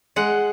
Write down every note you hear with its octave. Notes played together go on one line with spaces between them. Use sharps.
G#3 F#5